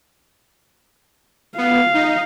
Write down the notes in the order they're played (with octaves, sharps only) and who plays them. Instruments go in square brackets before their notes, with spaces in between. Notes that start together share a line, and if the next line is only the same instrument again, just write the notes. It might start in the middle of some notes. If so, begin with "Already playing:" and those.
[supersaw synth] B3 [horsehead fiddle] F5
[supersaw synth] D#4